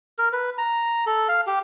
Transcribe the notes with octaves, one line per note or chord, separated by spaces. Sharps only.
A#4
B4
A#5
A4
F5
G4